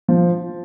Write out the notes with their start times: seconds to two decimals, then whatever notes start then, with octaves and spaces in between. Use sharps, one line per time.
0.08 F3